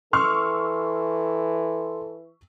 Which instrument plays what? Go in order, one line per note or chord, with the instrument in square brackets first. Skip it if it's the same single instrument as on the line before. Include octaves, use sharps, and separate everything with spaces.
[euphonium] E3 [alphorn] A4 [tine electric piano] C6 [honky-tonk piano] C#6 E6 F6